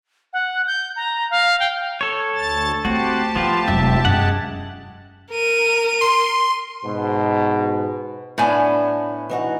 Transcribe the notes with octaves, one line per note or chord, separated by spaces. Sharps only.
F#5
G6
A#5
F5
G5
A4 C#5
D2 A5 A6
A3 C4 F#4 G4 A5
F3 A3 B3 F4
E1 F#3 E5
F#2 G#3 F#5
A#4 D#7
C6
G#2 B2
A2 B3 D4 G#5 A5
E3 D#4 F#4